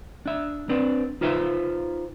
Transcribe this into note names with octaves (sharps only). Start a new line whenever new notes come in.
D4 E5
C4 D4 B4
D#4 F4 B4 C5 E5